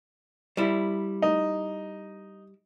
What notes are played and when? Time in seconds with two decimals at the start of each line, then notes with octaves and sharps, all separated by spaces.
0.57 G3 E4
1.22 D#4